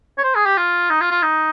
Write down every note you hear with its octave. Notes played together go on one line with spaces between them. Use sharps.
C#5
C5
G#4
G4
F4
D#4
F4
F4
D#4